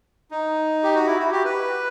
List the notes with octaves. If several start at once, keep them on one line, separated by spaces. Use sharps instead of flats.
D#4
G4
F#4
E4
F#4
G4
B4